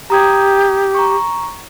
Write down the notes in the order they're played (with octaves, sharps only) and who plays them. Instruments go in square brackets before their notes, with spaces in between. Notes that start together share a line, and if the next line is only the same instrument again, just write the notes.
[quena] G4 [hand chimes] A#5 D#6 G#6
[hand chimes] A#5 C#6